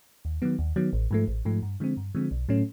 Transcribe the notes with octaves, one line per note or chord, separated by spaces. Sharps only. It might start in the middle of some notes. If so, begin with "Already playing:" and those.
D#2
D#3 F#3 B3
D#2
D#3 F#3 B3
A1
G#2 F3 A3
A1
G#2 F3 A3
G2
D3 F3 G#3 C4
G2
D3 F3 G#3 C4
B1
A2 F#3 A3 C#4